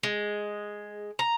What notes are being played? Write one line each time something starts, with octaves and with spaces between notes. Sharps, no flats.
G#3
A#5